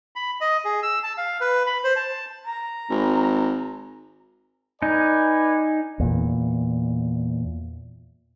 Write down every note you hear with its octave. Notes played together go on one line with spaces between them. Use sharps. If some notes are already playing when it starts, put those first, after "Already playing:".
B5
D#5
G#4
E6
A5
F5
B4
B5
C5
A5
A#5
G#1
D#4 B4 D5 G#5
E2 A#2